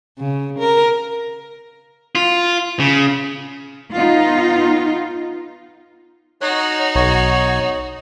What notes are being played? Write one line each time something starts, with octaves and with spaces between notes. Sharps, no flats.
C#3
A#4
F4
C#3
B3 D#4 F4
D#4 F#4 C#5 F#6
B1 C#5